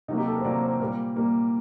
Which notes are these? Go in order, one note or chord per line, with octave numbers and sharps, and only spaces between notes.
C3 F#3 A#3 D#4
G4
A4
A#4
C5
C3 F#3 A#3 D5
C5
A#2 G3 A#3 A#4
A#2 G3 A#3